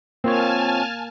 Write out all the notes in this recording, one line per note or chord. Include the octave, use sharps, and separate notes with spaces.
A#3 C4 F4 C#5 G#5 A5 F6